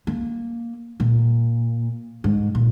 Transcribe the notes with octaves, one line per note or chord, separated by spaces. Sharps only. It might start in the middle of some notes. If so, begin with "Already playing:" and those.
A#3
A#2
G#2
A#2